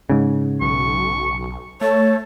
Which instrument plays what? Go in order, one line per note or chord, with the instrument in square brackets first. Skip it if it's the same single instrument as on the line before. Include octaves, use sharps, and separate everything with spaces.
[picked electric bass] G#2 C#3
[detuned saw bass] B1 [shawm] C#6
[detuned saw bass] A3 [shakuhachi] C#5 [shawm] A5